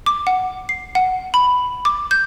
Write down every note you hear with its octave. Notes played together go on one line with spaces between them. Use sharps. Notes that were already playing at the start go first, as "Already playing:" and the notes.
D6
F#5
C7
F#5
B5
D6
G6